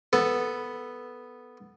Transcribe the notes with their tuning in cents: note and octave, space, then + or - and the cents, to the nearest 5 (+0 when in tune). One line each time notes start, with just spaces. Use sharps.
B3 +0 A4 +0